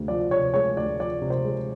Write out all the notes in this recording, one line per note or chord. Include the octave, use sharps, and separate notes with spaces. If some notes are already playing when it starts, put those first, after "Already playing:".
Already playing: D2 C3 G#3
F3 D5
C3 C#5
G#3 C#5
D2 D5
F3 D5
C3
C5
G#3